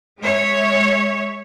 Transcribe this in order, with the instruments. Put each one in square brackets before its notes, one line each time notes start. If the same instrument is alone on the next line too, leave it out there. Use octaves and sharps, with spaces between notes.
[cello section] G#3 C#5 E5